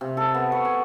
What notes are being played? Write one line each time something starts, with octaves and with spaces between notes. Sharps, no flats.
C3
A4
B3
C#6
G#5